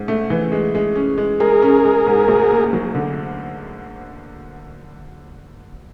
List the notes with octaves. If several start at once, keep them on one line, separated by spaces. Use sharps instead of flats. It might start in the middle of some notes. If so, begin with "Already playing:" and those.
Already playing: G#2
A3
E3
G#3
G#3
C#4
G#3
G#3 G#4 A#4
C#4
G#3
G#2
D2
A#3
F#3
D3